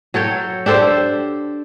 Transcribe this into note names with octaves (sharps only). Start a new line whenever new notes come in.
F#3 A4 C#5 G5
D4 G4 A4 C5